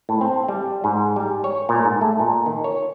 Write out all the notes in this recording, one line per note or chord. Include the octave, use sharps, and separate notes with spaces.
A2
C4
G3
G#2
G3
C#5
A#2
G#2
A3
A#2
D#3
C#5